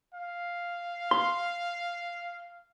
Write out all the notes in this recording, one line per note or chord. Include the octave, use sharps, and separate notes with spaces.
F5
C6